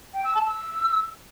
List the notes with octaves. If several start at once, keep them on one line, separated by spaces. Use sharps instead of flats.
G5
E6
A5
E6